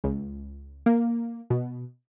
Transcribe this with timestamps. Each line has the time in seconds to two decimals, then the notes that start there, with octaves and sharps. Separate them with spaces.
0.04 C#2
0.86 A#3
1.50 B2